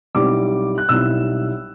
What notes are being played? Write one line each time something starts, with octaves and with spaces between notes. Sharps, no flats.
B1 B2 G3 C4 E4 D6
F#6
B1 B2 G3 C4 E4 E6